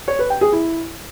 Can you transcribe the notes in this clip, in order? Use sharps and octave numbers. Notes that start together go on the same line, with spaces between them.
C#5
B4
G5
G#4
E4